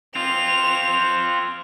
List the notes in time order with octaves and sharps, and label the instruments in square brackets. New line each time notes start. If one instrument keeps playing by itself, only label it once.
[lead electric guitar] C4 F4 [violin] F7